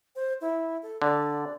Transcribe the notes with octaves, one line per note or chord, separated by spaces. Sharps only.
C5
E4
A4
D3 D5